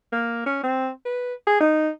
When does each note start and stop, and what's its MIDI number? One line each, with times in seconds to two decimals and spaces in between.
0.12 0.42 58
0.46 0.59 61
0.63 0.89 60
1.05 1.34 71
1.47 1.59 68
1.60 1.89 63